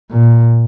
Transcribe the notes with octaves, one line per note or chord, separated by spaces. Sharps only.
A#2